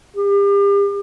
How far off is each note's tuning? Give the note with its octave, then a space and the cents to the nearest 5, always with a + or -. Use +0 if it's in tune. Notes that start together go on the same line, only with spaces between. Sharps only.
G4 +35